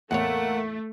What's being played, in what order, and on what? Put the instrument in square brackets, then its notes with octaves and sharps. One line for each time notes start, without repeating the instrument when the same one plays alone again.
[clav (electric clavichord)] E2 A2 C#5 [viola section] A3 [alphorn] A#3 [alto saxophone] F#5